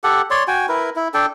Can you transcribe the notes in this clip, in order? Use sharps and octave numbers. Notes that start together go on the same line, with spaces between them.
G4 A4 F#5
C#5 D5 C6
F#4 G5 G#5
E4 A#4 B4
E4
D4 A4 G5